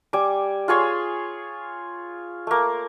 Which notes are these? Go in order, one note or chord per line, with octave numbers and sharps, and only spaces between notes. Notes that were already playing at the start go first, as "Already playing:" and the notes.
G3 G#5 D6
F4 G#4 C#5 C6
A3 A#3